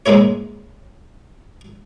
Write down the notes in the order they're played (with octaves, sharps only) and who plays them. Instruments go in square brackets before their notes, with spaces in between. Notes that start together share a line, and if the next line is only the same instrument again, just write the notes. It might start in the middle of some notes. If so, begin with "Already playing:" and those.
[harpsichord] G#2 G#3 A#3 E4 C#5